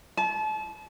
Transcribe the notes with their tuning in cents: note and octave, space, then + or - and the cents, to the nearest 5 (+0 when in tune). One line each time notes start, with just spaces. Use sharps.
A5 -35